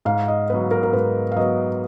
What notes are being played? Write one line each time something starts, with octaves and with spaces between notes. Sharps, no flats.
G#2 F5
D#5
F#3 B3 B4
A#4
A#4
G#2 B4
F5
F#3 B3 D#5